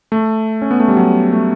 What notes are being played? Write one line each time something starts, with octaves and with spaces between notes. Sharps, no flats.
A3
C#4
B3
A3
G3
F#3
A3